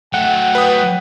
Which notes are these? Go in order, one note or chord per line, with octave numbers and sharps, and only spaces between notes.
F#3 A3 F#5 G5
B4 D#6